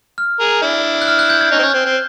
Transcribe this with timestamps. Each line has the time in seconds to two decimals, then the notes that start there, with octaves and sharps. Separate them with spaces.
0.18 F6
0.40 G#4 A#4
0.62 D4 E4
1.02 F#6
1.08 F6
1.19 F#6
1.30 G6
1.41 G#6
1.52 C#4 D#4
1.59 C4
1.63 C#4
1.74 C4
1.85 C4